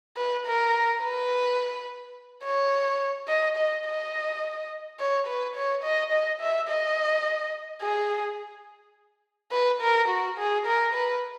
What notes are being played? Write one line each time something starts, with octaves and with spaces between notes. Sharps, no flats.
B4
A#4
B4
C#5
D#5
D#5
D#5
C#5
B4
C#5
D#5
D#5
E5
D#5
G#4
B4
A#4
F#4
G#4
A#4
B4